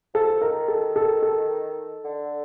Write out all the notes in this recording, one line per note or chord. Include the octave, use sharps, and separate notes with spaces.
F3 A4
D#3 A#4
A4
A4
A4
D3